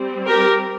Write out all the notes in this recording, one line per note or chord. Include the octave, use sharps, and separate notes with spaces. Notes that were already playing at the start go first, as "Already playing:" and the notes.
Already playing: G3 C4
G4 A#4